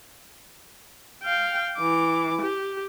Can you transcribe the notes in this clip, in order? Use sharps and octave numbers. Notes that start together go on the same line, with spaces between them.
F5 G5
E3 D6
G4